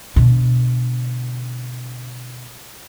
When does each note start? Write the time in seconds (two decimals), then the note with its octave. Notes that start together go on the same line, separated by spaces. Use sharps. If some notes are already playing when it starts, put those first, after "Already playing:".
0.16 B2 D3